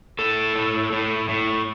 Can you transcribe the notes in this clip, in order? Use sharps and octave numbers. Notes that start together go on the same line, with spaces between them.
A2 A4
A2
A2
A2